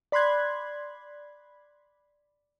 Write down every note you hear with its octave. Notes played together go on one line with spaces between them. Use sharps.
D5 B5 C6 F#6 G#6